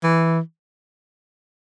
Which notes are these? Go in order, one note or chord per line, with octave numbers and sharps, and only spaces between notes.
E3